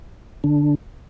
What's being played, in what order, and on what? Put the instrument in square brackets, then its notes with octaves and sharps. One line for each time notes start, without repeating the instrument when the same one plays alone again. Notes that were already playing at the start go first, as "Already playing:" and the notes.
[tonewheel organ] D3 D4